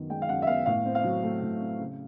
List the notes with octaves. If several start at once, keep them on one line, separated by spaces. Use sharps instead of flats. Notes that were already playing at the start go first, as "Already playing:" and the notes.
Already playing: F#2 D#3 B3
G#3 G5
F5
F#2 F#5
E5
B3 F5
A2 F5
C4
F5
F#3
A3
A2
C4
C#3